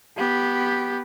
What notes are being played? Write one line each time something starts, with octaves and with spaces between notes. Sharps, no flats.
B3 G4